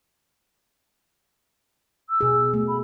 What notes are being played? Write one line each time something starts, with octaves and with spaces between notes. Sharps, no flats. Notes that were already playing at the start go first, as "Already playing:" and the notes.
E6
B2 G#4
A3
B5